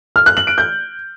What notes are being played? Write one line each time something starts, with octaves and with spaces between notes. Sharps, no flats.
F6
F#6
F#7
D7
G6